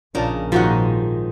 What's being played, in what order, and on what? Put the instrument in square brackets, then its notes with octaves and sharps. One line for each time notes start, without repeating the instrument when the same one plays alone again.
[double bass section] A#1 [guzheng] C#3 D#4 A#4 [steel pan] D4 F4 A5
[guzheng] G#2 D#3 D#4 [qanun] F3 [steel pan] F4 F#4 F#5